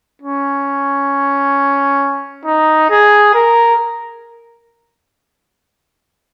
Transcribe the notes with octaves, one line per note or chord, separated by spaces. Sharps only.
C#4
D#4
G#4
A#4